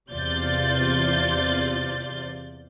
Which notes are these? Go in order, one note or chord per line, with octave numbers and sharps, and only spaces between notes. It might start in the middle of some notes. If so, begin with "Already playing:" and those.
E2 C3 F4 D5 G6 A6